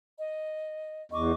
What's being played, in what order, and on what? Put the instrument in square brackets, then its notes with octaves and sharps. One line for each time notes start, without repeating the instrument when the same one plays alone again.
[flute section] D#5
[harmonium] E2 [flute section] D#5 C#6 D6